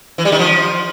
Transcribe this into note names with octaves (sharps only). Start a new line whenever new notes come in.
E3
G3
D#3
F3